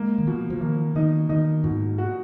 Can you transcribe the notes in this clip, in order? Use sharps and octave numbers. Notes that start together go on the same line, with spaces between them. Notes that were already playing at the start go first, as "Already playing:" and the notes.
Already playing: G#3 A#3
D#3
B2 F3
F3
D#3 A#3
D#3 D#4
D#3 D#4
G#2 B2
F#4